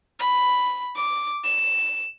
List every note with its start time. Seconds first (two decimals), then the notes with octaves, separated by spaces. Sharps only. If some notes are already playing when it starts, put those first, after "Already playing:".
0.19 B5
0.95 D6
1.44 E7